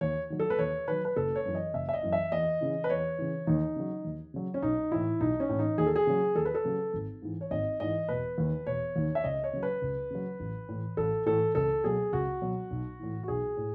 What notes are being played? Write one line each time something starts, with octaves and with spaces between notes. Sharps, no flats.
D#2 C#5
D#3 F#3
A4
B4
D#2 C#5
D#3 F#3 B4
B4
F#1 A4
C#5
F#2 E3
D#5
F#1 E5
E5
D#5
F#2 E3
E5
E2 D#5
C#3 E3
B4
E2 C#5
C#3 E3
D#2 D#4
C#3 F#3
D#2
C#3 F#3
C#4
B1 D#4
A2 E3 E4
B1 D#4
C#4
A2 E3
D#4
D#2 G#4
A4
G#4
C#3 F#3
D#2 A4
B4
A4
C#3 F#3
G#1
G#2 E3
C#5
G#1 D#5
G#2 E3 D#5
E1 B4
D#2 D#3
E1 C#5
D#2 D#3
E5
C#2 D#5
C#5
C#3 F#3
B4
C#2
C#3 F#3
A1
A2 E3
A1 A4
A2 E3 A4
C#2 A4
B2 F#3 G#4
C#2 F#4
B2 F#3
B1
A2 E3
F#4
B1 G#4
A2